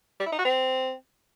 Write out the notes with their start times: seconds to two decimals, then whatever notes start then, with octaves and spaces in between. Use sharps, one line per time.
0.20 G3
0.26 E4
0.32 D#4
0.39 F#4
0.45 C4